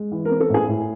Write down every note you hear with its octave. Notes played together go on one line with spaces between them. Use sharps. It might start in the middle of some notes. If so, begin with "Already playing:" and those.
Already playing: G#3
E3
A#4
C4
A4
A2 G#4
A2